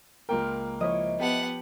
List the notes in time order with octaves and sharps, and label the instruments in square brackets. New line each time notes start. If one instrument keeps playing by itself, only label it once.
[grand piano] C#2 A#3 G5 [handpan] F4 A#4
[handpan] F3 C#5 [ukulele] E4 D#5
[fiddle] B3 F#5 [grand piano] G4 A5